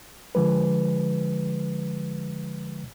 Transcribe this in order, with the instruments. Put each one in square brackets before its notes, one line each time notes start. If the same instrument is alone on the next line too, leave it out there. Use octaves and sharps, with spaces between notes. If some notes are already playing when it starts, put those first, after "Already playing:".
[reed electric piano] D3 F3 G#3 B4